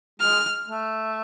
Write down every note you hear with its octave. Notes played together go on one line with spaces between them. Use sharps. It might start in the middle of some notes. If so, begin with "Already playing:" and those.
G#3 F6
A3